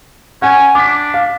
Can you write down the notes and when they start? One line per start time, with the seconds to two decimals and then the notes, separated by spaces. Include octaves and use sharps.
0.42 C#4 F#5 G#5
0.75 D4 D6 B6
1.14 F5